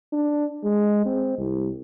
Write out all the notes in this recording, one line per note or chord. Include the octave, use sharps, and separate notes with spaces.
D4
G#3
C4
C2